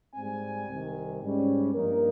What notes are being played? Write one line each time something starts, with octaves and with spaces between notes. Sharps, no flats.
G#2 G3 C4 G#5
C2 C3 D#3
G#2 G3 C#4
G2 F3 A#3 D#4 A#4